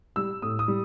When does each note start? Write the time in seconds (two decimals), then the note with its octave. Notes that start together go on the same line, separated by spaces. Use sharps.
0.16 G3 E6
0.42 A2 D#6
0.59 D#6
0.68 G3